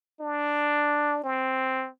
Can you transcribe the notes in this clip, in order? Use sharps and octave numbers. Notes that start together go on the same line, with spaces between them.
D4
C4